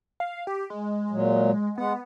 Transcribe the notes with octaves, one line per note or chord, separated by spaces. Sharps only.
F5
G4
G#3
A#2 F#3
G#3 B3 F#5